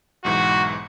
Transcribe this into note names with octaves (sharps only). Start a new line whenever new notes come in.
B1 G#2 E3 F#4